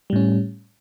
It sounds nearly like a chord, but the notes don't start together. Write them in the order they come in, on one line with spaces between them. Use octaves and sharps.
G3 A2 C#4